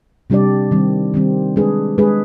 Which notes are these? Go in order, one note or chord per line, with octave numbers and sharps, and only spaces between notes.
C3 G3 D4 G4 D5
D#3 G3 C4
D#3 G3 C4
G#3 D4 G#4 B4
G#3 D4 G#4 B4